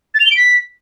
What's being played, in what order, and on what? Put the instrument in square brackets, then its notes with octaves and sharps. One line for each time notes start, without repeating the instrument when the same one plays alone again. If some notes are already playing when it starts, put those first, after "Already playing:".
[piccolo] A6
F7
G7
D7
B6